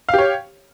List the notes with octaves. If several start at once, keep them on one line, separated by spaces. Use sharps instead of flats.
G4 C#5 F5